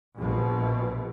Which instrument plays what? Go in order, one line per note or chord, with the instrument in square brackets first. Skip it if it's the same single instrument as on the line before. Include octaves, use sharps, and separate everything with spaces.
[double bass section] A#1 B2